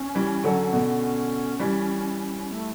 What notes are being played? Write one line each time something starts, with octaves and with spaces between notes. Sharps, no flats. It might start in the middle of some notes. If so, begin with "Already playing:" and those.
Already playing: C#4
E3 G3
D3 F#3
B2 D3 C#4
E3 G3
C#4
A3